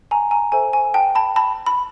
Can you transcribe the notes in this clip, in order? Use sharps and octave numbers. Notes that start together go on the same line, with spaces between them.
G#5 A#5
G#5 A#5
A4 C5 E5 G#5
G#5
G5 A5
A5 B5
A5 B5
B5